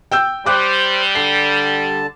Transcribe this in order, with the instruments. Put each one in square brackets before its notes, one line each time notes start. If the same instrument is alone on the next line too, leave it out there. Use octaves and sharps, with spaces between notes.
[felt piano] G5 E6 G6
[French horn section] G3 [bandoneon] C5 [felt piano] D6 F#6
[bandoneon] D3 A5 [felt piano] C7